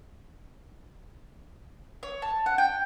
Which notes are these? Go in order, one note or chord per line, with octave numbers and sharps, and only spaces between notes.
C#5
A5
F#5
G5